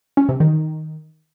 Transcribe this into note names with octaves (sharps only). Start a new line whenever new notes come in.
C#4
C3
D#3